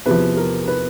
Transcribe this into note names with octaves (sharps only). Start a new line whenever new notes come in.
E2 C3 F3 B4
A#4
B4